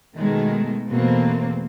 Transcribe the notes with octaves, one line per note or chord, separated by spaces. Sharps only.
B2 D#3 G#3 A3
E2 B2 A3 A#3 C4